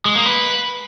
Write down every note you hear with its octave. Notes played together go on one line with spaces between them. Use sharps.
G#3
A#3
B4